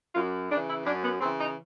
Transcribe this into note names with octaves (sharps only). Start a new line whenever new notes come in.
F#2 F4
C#3 E3 D4
E4
F#2 D4
B3
C#3 E3 C4
D#4